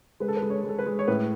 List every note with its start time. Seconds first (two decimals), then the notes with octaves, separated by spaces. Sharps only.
0.20 G#3 B4
0.28 A4
0.36 B4
0.42 G#3
0.50 C#5
0.64 G#3 A4
0.79 B4
0.86 G#3
0.99 C#5
1.08 A2 B4